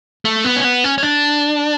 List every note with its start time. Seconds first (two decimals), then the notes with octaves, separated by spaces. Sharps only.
0.25 A3
0.44 B3
0.56 C#4
0.64 B3
0.84 C#4
0.98 C#4
1.03 D4